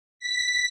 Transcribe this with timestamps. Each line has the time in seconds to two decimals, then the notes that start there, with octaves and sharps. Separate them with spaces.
0.19 B6